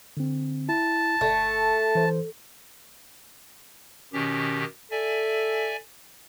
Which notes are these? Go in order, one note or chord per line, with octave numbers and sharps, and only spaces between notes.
D3 C4
E4 A5
G1 A3
E3 C5
B2 D#3 C#4 G4
A4 D5 E5 G#5